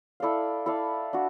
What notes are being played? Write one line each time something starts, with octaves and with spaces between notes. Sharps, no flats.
E4 A4 D5 F5
E4 A4 D5 F5
D4 F#4